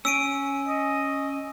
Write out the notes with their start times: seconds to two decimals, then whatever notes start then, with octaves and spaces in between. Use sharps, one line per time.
0.05 C#4 E6 D7 D#7
0.68 D#5